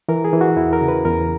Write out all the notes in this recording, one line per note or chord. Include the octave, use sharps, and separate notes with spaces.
E3 A#4
G#4
E3
F#4
E2 E4
A#4
C#3
B4
E2 A#4